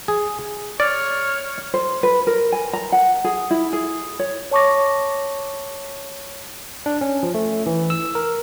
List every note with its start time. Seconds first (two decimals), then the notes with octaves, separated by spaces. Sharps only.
0.08 G#4
0.80 C#5 D5 F6
1.74 C5
2.03 B4
2.27 A#4
2.52 G#5
2.73 A#5
2.92 F#5
3.24 G#4
3.51 E4
3.73 G#4
4.19 C#5
4.51 C#5 A5 C#6 D6 A#6
6.86 D4
7.01 C#4
7.23 F3
7.34 A3
7.66 E3
7.90 E6
8.15 A#4